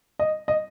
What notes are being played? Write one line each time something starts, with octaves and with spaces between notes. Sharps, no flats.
D#5
D#5